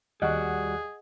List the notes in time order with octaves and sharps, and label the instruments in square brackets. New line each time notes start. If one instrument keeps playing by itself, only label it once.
[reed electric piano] D#2 F#6 [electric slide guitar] G3 F#4 [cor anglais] G#4 [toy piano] D#5 F#5